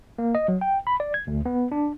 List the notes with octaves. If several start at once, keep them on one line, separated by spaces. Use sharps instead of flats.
A#3
D#5
F#3
G5
B5
D5
G#6
D2
B3
D4